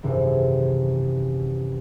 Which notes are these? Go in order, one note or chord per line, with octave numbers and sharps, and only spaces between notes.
G#1 F#2 C3 E3